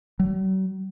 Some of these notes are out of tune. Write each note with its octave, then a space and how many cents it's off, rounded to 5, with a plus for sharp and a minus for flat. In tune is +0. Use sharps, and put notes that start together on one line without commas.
F#3 +45